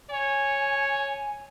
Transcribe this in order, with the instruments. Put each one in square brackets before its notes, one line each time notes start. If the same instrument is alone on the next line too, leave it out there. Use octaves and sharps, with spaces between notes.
[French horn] C#5 [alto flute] G#5